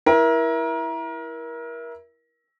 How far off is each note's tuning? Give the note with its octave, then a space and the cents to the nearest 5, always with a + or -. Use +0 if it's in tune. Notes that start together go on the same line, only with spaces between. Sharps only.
E4 +0 A#4 +30